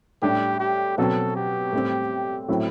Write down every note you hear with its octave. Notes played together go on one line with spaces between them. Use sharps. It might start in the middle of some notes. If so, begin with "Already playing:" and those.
A2 G3 D4 G4
G4
B2 F#3 C4 A4
G4
A2 G3 C4
A2 F#3 C4 E4